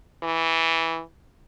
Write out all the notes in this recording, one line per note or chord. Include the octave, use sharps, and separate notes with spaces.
E3